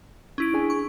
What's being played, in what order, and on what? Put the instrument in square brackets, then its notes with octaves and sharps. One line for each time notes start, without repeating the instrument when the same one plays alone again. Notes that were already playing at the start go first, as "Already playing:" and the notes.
[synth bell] C#4 E4 D7
[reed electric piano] D4 G#4 G#5
[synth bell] C#6